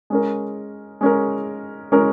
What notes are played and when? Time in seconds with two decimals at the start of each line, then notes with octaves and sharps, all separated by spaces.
0.10 G#3 C#4 A#4
1.01 G#3 C#4 A#4
1.92 G#3 C#4 A#4